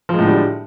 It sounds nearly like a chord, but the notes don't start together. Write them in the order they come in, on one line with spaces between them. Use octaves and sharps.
F3 G#3 A2 D3 G3